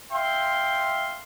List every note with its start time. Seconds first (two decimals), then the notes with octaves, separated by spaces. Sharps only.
0.12 E5 F5 G5 C6